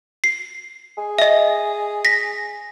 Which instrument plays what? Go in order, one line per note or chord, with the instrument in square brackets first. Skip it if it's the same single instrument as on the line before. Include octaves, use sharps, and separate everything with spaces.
[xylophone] C7
[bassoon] G#4
[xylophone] D#5 E5
A#6 B6